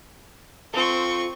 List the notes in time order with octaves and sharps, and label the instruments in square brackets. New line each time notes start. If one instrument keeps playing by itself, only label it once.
[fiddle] C4 C#6 [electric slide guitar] F4 A4